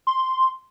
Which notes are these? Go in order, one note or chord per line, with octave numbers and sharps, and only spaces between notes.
C6